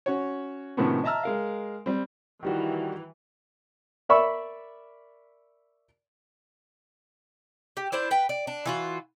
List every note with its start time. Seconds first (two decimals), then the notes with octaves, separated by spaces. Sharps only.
0.06 C#4 F#4 C#5
0.77 A2 C3 D#3 F3 B3 C#4
1.04 D#5 E5 A5 A#5 E6 F6
1.23 G#3 A#4 F5
1.86 G3 C4
2.43 D#3 E3 G3 F#4
4.09 A#4 D5 E5 B5 C#6 E6
7.77 G4
7.92 D4 E4 C5 D5
8.11 B4 G5
8.29 D5
8.47 D4
8.66 E3 F4 F#4